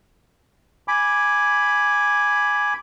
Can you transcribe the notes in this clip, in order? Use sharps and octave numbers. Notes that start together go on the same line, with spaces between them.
G#5 B5 D6